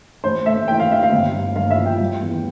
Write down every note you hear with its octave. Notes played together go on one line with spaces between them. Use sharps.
A1 C5
A3 E5
E3 G5
F5
A1 E5
F5
G1
G2
G2 F5
E5
F3
G5
G3
E2